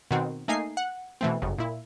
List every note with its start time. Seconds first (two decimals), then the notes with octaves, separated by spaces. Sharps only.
0.11 B2 D#3 C4 F#4
0.48 A3 A#3 D#4 G#5 C7
0.77 F#5
1.21 B2 E3 A3 C4
1.42 G1 F#2 C#3
1.58 A#2 E4